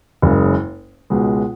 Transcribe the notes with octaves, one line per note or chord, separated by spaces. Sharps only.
F#1 F#2 C#3 G#3
C#2 B2 G#3